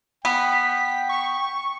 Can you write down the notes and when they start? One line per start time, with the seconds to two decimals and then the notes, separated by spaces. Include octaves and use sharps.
0.25 B3 G5 B6
1.09 C#6